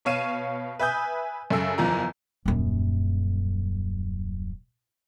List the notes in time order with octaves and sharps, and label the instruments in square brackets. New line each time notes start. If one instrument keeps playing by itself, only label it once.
[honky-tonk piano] B2 C#5 F5 D#7 E7
B4 E5 G#5 D#6 G6
F#2 C#3 G#4 A4 E6
F#1 E2 F3 A#5
[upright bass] D#1 F#2